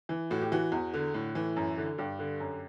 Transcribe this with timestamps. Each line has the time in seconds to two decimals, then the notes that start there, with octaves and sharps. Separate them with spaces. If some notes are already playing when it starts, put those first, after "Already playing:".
0.09 E3
0.30 A2 F#4
0.41 G4
0.52 E3 F#4
0.72 E2
0.94 D3
1.14 A2
1.35 E3
1.56 F#2
1.78 D3
1.98 G2 G4
2.19 D3
2.40 F#2